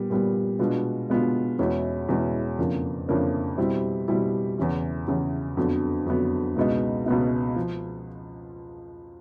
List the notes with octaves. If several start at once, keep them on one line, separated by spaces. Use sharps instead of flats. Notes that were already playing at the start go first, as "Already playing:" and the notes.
Already playing: A#2 G3 B3
A#2 G3 B3
B2 G#3 B3 D4 F4
B2 G#3 B3 D4 F4
E2 B2 G#3 C#4 E4
E2 B2 G#3 C#4 E4
F2 C#3 F3 A#3 D4
F2 C#3 F3 A#3 D4
B2 G3 C4 E4
B2 G3 C4 E4
E2 C#3 E3
E2 C#3 E3
F2 D3 F#3 B3
F2 D3 F#3 B3
C#2 B2 G#3 B3 D#4
C#2 B2 G#3 B3 D#4
F3